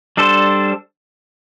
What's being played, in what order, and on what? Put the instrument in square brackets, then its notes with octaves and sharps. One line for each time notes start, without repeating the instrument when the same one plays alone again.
[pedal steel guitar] G3 D4 A4 C5